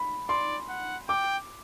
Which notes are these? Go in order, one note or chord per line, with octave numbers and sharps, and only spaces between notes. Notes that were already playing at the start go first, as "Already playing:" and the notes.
Already playing: B5
D5 C6
F#5
G5 D6